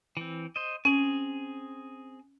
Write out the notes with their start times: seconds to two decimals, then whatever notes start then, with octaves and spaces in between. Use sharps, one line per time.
0.17 E3 C4
0.56 C5 D#5
0.85 C4 C#4 G#4 G#5